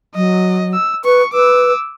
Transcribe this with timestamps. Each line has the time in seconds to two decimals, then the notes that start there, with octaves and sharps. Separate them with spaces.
0.16 F#3 D#5
0.74 E6
1.05 B4 C#6
1.33 B4 D6 E6